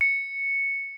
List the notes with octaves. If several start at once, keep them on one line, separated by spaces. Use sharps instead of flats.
C#7